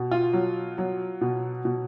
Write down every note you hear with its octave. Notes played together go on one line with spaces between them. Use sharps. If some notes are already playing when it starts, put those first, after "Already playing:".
Already playing: B2
F4
F#3
F#3
B2
B2